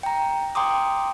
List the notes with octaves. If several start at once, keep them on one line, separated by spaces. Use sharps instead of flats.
G5 A#5
G5 A#5 C6 D6 D#6